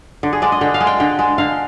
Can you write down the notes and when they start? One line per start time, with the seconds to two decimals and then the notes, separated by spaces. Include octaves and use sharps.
0.23 D3
0.33 G#4
0.42 G#3 D5
0.52 D#5
0.61 D3 G5
0.74 F5
0.80 G#3
0.87 G5
1.00 D3 G5
1.19 G#3
1.38 D3 F5